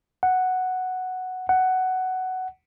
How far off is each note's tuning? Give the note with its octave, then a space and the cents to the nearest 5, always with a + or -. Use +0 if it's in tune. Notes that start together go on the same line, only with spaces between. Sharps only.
F#5 +0
F#5 +10